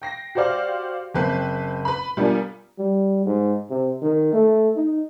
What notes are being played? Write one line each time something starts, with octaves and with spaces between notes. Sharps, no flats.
G5 A#6 C7
F#4 G4 C5 D5 F5
F#1 C4 B4 F#6 C7
B4 B5
G3 B3 D4 F4 A#4 G#5
G3
G#2
C3
D#3
A3
D#4